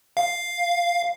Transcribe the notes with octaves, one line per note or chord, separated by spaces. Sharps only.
F5